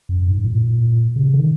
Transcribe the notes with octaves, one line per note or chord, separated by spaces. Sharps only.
F#2
G#2
G#2
A#2
C#3
D#3